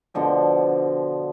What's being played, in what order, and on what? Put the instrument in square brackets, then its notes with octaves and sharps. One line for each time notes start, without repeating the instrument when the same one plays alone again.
[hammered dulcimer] B2 D3 F3 G5